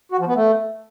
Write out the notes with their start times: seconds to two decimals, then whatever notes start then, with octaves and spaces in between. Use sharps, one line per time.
0.12 F#4
0.20 F3
0.27 B3
0.35 A3